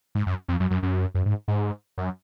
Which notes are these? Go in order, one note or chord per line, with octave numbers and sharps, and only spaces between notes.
G#2
F#2
F2
F#2
F#2
F#2
F#2
G#2
G#2
F#2